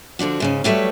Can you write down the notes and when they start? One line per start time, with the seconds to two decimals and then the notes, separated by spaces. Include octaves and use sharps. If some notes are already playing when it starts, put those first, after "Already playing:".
0.19 D3 F3 D4 F#4
0.40 G#2 C#3 C#4
0.64 F#3 G3 A3 E4 B4 C#5